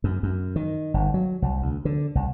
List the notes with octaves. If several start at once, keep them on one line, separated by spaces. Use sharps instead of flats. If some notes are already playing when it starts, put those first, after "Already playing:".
F#2
F#2
D#3
G1
F#3
C2
D2
D3
C2